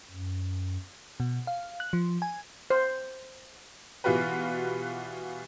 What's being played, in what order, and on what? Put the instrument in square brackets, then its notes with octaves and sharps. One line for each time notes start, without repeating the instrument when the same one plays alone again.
[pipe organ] F#2
[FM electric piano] B2
F5
F#6
F3
G#5
[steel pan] C5
[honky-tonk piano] B2 E3 G3 F4 F#4 B4